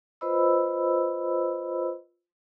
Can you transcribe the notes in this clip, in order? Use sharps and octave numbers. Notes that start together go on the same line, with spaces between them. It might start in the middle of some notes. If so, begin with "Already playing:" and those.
F4 B4 C5 D#5 B5 E6